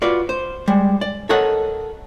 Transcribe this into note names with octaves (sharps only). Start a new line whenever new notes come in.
F4 F#4 B4 D5
C5
G3 G#3
D5
A4 A#4 C#5 D#5 F#5